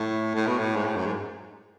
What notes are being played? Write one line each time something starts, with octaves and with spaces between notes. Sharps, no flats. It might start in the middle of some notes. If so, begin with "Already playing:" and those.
Already playing: A2
A2
B2
A2
G#2
A2
F#2
G#2